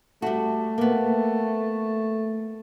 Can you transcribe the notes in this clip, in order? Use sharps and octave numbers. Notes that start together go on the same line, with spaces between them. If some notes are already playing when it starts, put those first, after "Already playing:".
G3 A3 F#4
A#3 B3